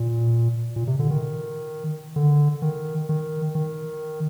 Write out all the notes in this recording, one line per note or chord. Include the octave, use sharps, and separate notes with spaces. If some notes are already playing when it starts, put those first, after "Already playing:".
Already playing: A#2
A#2
C3
D3
D#3
D3
D#3
D#3
D#3